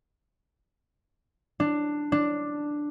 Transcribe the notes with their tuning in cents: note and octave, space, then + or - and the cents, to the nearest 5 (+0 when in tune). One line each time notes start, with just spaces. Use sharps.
D4 +10
D4 +5